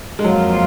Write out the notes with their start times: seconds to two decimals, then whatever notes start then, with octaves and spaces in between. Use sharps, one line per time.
0.19 G#3
0.24 F2 F3 F#3 A#3 F4